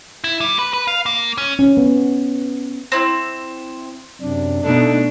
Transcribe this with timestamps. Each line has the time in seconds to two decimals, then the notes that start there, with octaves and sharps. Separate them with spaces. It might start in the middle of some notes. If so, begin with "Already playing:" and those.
0.24 E4
0.41 G3
0.59 B4
0.73 B4
0.88 F5
1.06 A#3
1.38 C#4
1.59 C#4
1.77 B3
2.92 C4 E4
4.21 F#2 C3 D4
4.64 B2 A3 D4 D#4 A4